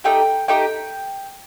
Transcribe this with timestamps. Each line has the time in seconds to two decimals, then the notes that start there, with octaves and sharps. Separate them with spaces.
0.04 A3 D#4 G4 G5
0.48 A3 D#4 G4 G5